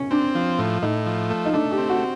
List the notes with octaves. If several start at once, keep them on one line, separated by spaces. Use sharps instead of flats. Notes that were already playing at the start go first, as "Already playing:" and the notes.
Already playing: C#4
C4 D4
F3
A2
A2 D#4
F3
A3
D#4
A3 D4
G4
C4
F#4